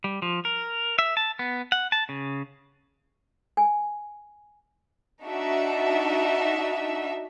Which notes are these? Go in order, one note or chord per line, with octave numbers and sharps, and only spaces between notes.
G3
F3
A#4
E5
A5
B3
F#5
A5
C#3
G#5
D4 D#4 F#4 E5